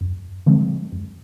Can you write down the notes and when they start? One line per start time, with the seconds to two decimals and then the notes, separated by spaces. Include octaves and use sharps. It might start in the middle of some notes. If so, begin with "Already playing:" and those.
0.01 F#2
0.46 D3 F3 G#3 C4
0.92 F#2